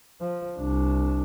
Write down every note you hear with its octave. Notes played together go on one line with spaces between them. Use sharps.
F3
C2 D4